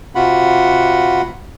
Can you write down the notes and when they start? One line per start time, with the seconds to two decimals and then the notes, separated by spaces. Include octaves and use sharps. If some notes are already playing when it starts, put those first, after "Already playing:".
0.15 C3 F4 F#4 F#5 B5